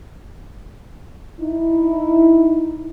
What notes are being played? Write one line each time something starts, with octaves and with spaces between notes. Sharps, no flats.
D#4 E4